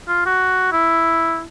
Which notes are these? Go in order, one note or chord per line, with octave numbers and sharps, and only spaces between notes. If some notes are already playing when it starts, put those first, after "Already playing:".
F4
F#4
E4